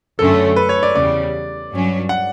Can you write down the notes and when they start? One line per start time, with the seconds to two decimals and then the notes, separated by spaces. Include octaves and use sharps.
0.19 F#2 D3 A3 C#4 A4
0.56 B4
0.69 C#5
0.83 D5
0.95 E2 C#3 G3 D5
1.71 G2 F#3 C#4
2.09 F#5